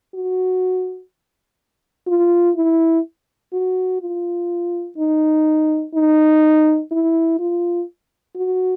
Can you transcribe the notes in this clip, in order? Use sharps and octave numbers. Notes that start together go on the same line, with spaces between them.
F#4
F4
E4
F#4
F4
D#4
D#4
E4
F4
F#4